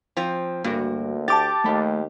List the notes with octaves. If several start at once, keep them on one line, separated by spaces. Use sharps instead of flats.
F3 C4
D2 G2 A#3 F#4 A#4
G4 A5 D6 A6
D#2 A3 B5